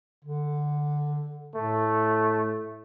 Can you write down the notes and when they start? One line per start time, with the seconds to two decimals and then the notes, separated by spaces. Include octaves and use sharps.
0.24 D3
1.55 A2 A3